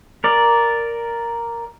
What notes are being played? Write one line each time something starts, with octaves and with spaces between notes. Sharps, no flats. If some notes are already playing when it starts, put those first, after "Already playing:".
A#4 D5